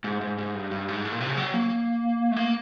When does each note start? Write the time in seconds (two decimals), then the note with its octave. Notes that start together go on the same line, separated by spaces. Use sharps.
0.04 G#2
0.21 G#2
0.38 G#2
0.55 G2
0.71 G2
0.88 G#2
1.05 A2
1.12 A#2
1.20 C3
1.29 C#3
1.37 F#3
1.54 A#3
2.31 A3
2.37 A#3